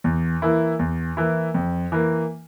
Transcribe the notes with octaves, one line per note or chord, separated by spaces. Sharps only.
E2
E3 A#3 E4
E2
E3 A#3 E4
F2
E3 A#3